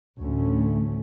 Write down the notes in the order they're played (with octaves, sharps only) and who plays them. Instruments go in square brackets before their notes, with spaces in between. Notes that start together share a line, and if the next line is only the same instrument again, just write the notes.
[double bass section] A1 D2 A3 C#4